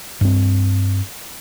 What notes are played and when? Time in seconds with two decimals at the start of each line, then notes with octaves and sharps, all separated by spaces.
0.21 G2 C4